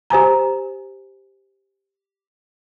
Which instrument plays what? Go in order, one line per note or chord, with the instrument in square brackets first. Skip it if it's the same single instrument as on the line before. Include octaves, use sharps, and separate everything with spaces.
[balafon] G4 C5 G#5 A#5